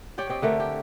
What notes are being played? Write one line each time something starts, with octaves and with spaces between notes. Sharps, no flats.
G4 C#5 D5 G5
C4 G4 D#5
D3 A3 A#4
G4